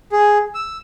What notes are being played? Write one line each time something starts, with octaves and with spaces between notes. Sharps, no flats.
G#4
E6